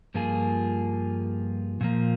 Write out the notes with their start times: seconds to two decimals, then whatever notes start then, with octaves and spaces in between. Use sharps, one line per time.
0.14 G2 F3 A#3 F4 G#4
1.81 A#2 F3 A#3